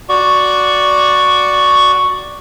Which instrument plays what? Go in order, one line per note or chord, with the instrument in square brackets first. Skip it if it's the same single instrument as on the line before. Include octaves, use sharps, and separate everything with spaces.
[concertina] F#4 D5 C#6